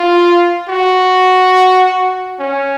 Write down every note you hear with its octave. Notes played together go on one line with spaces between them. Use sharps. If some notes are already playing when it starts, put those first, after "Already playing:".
Already playing: F4
F#4
C#4